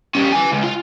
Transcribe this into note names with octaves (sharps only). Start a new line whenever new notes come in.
G3 C#4
B4 G#5
C#2
F4